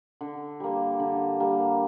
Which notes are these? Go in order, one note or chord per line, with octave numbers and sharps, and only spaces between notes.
D3
G3 A#3
D3
G3 A#3